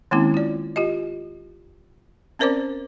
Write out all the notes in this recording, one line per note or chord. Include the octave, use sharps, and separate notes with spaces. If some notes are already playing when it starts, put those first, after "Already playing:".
D#3 G#3 A#3 C4 C#4 E4
F4 D5
F4 G4 D#5
C4 C#4 A#4 C5 D5 D6